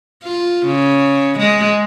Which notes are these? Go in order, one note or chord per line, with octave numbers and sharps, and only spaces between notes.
F4
C#3
G#3